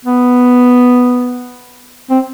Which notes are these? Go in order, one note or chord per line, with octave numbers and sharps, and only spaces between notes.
B3
C4